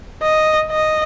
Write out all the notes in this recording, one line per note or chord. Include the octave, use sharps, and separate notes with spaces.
D#5
D#5